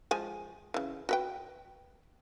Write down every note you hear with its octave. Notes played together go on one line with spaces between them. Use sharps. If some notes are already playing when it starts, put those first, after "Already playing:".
F3 G#3 G#5
C#3 E3
F#4 B4 G5